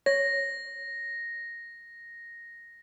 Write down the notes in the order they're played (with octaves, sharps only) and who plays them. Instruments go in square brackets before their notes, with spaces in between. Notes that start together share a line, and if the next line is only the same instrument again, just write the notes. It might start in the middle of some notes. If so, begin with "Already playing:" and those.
[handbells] C#5 [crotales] A#6